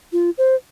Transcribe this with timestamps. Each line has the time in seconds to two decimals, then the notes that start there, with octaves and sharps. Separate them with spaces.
0.13 F4
0.38 C5